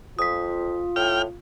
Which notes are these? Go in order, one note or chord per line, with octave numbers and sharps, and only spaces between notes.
F2 F4 D#6 B6
A2 G5 F6